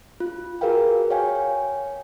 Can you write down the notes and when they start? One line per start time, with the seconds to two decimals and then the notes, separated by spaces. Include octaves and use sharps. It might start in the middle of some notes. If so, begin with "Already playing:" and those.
0.20 F4
0.61 F#4 G#4 A#4 B4 F5 G5
1.10 C#5 F5 G5 G#5